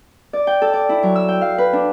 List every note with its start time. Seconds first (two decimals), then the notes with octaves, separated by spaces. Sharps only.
0.33 D5
0.47 G5
0.62 A4
0.73 D5
0.89 E4
1.03 F#3
1.16 E6
1.28 G5
1.41 F5
1.58 B4
1.73 D4